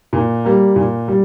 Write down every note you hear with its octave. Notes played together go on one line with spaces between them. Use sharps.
A#2
G3 A#3
A#2
G3